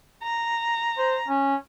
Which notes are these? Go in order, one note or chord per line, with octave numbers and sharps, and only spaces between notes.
A#5
C5
C#4